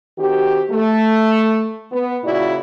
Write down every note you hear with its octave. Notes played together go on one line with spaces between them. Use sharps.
D#3 C4 F#4 G4
A3
B3
A#2 C#3 E4 F#4 D5